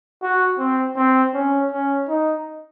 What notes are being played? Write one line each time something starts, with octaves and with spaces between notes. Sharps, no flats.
F#4
C4
C4
C#4
C#4
D#4